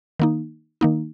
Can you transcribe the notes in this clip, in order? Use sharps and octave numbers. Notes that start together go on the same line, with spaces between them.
D#3 A#3 D#4
D#3 A#3 D#4